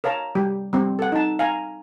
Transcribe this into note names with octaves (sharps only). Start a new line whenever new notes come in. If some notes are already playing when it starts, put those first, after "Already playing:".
A#4 C#5 F5 A5 A#5
G3 G4
G3 C4
A4 F#5
D#4 A5
F5 G#5 A#5